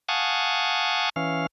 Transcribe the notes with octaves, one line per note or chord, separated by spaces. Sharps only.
F5 F#5 G#5 A5 C#6 D#6
E3 C#4 F5